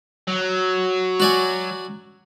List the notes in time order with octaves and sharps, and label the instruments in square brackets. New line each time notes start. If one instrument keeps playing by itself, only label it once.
[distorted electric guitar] F#3
[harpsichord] F#4 D5 G#5